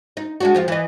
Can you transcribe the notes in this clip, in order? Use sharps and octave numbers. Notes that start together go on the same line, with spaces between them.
D#4
G#3 D4 F#4
F2 F3 F4
E3 D#5